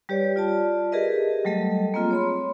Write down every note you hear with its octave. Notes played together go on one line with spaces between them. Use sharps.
G3 G4 B4 C#5 D5
F4 D5 A5
G4 G#4 A#4 B4 D#5 E5
F#3 G3 A3 A4 D#5
A#3 C4 F4 G#4
C#5 B5 C6